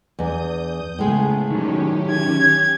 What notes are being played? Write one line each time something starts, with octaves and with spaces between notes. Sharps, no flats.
E2 D4 D#6 G6
A2 C#3 G#3 B3
D#3 F#3 C#4 G4
G#6